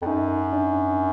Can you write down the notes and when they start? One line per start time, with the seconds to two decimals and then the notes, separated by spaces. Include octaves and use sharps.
0.02 F2
0.06 F#2 D#4
0.53 D4